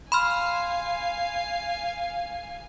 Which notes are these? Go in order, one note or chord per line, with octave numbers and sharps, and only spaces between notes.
F5 G#5 B5 C6 F6